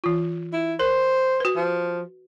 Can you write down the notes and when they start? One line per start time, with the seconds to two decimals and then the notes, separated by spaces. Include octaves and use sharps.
0.04 E3 F4
0.53 E4
0.80 A#4 C5
1.40 F#4 B4
1.56 F3